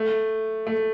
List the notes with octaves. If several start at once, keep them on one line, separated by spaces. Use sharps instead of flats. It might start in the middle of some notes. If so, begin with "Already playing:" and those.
Already playing: A3
A3